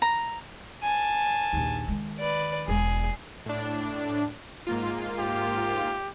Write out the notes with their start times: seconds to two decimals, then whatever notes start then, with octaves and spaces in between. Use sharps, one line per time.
0.02 A#5
0.83 G#5 A5
1.53 A#1 D#2
1.88 D#3 G#3
2.20 B4 D5
2.68 E1 G#3 G#4
3.46 A2 D4
4.67 G#2 A#3 F4
5.19 G4